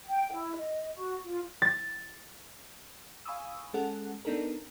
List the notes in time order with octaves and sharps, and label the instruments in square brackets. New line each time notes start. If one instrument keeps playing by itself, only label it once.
[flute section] G5
E4
D#5
F#4
F4
[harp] A6
[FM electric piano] F5 G#5 B5 C#6 D#6 E6
G#3 C#4 G#4 A4 F#5
B3 D4 D#4 A4 A#4